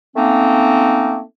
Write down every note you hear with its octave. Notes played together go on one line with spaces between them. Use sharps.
A3 A#3 C4 C#4 D#4